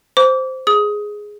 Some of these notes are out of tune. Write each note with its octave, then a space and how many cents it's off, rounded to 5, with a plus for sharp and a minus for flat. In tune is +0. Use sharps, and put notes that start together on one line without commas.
C5 -5 D6 -30
G#4 +0 D#6 +15